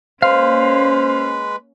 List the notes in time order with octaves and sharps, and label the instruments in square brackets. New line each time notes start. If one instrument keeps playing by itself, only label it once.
[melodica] G#3 B4 [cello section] A#3 C#4 [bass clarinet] C5 [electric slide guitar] F5